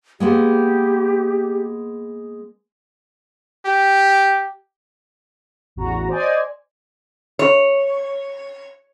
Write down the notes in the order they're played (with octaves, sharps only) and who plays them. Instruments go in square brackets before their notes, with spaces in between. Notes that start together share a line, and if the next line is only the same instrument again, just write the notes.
[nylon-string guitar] G#3 A#3 B3 [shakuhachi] G4
[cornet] G4
[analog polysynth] A1 E2 F#4 A#5
C5 D5 D#5 G#5
[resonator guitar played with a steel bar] C#5